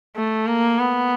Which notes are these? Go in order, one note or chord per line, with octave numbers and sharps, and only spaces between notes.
A3
A#3
B3